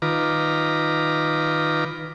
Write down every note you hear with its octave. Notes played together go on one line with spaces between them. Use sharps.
D#3 F4 B4 A#5 D6